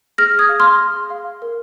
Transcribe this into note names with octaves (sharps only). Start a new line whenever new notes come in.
G#4 F6 A#6
D#6 G#6
F5
C6 F6
G#4
F5
A#4